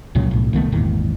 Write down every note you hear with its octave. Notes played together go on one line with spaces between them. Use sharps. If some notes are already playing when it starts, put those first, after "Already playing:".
C#2 A#2 C#3 F#3
B1 A2
C2 D#3 A3 B3
G#1 E2 A#2 D#3